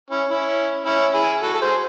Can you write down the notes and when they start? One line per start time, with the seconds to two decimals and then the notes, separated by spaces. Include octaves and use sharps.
0.10 C#4 E4
0.29 C#4 E4
0.86 C#4 E4
1.14 E4 G#4
1.42 F#4 A4
1.54 A4
1.61 G#4 C5